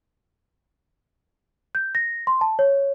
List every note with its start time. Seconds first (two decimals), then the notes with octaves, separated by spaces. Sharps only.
1.75 G6
1.95 A#6
2.27 C6
2.41 A5
2.59 C#5